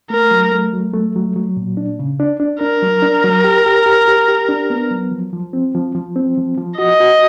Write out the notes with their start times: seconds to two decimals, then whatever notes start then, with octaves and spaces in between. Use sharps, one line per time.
0.10 A3 A#4
0.31 F#3
0.52 A3
0.73 F#3
0.94 A3
1.16 F#3
1.36 F#3
1.57 A#2
1.77 D4
1.99 C#3
2.20 D4
2.40 D4
2.61 D4 A#4
2.83 F#3
3.02 D4
3.24 F#3
3.44 G4
3.66 G4
3.86 G4
4.08 G4
4.28 G4
4.49 D4
4.70 B3
4.91 F#3
5.11 F3
5.33 F3
5.53 C4
5.75 F3
5.95 F3
6.16 C4
6.38 F3
6.58 F3
6.79 F#4 D#5
7.01 F#4